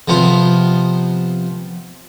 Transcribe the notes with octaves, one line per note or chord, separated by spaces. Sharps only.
C3 F3 B3 F4